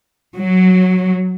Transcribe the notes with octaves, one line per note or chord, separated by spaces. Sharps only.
F#3